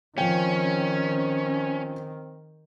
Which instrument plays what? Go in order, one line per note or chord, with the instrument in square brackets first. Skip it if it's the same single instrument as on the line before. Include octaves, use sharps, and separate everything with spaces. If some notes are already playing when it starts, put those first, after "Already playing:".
[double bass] D#3 [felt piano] F3 G5 [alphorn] C4 [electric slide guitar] C#4